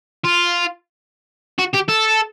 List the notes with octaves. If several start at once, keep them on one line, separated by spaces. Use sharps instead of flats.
F4
F#4
G4
A4